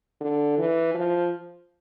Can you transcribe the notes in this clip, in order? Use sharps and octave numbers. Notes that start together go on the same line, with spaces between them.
D3
E3
F3